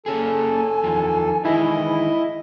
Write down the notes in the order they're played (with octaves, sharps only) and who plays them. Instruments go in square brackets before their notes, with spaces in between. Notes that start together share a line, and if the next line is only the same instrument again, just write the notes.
[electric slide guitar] A#3 C#4 G#4 [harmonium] A4 [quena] G#5
[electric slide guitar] E2 D#3 F3
[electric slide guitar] D#3 E3 G#3 [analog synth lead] E4 [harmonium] D#5